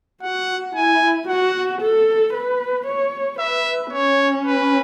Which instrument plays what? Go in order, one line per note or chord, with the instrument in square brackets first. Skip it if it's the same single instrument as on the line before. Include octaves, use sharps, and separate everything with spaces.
[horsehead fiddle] F#4 [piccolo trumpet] F#5
[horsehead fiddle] E4 [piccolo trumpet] G#5
[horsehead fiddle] F#4 [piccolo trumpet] F#5
[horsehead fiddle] A4
B4
C#5
[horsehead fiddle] B4 [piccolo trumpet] E5
[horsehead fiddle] C#4 [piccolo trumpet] C#5
[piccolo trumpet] B4